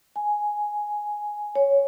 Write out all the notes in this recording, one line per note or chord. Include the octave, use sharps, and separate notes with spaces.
G#5
C#5